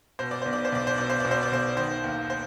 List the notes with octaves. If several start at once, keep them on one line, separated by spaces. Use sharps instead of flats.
B2 C5
D5
B1 C5
D5
C5
B1 D5
C5
B2 D5
C5
B2 D5
C5
D5
B1 C5
D#3 C5
D#2
C5